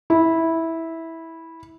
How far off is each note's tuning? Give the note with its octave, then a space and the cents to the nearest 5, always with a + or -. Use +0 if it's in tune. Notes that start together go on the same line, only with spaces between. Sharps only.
E4 -10